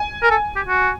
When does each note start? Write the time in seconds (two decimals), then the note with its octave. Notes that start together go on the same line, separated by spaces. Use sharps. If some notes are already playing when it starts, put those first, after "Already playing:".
Already playing: G#5
0.23 A#4
0.31 A4
0.56 G4
0.68 F#4